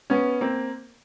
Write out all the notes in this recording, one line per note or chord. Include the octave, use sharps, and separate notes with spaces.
B3 C#4
A#3 C4